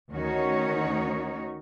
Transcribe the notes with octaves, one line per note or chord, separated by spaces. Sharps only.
D2 D#3 C#4 D#4 F#4 C#5